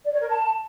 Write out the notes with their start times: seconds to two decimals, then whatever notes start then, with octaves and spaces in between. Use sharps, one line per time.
0.04 D5
0.12 C#5
0.20 A#4
0.28 A5